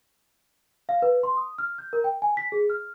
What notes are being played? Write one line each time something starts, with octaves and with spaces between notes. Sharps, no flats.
F5
B4
C6
D#6
F6
G6
A#4
G5
G#5
B6
G#4
F6